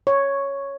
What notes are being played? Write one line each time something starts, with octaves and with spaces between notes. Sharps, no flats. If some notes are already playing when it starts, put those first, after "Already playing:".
C#5